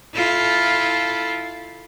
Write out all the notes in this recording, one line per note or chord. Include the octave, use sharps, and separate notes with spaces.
E4 F4 A4